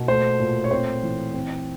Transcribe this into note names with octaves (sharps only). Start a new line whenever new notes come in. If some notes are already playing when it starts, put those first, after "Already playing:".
Already playing: B2 A#3
A3 C5
A#2
C#5
C4 C5
E3
C4